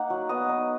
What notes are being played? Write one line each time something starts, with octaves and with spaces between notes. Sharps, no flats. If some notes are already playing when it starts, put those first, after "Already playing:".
Already playing: A#3 D#4 F#5
F#3
B3 D#5
D#4